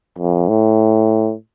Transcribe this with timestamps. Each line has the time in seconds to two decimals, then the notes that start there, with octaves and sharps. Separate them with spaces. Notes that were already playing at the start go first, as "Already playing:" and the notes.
0.18 F2
0.48 A2